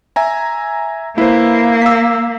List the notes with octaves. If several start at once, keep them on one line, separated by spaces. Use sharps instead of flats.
E5 G#5 A#5
A#3 E4 B4 C5
E6 B6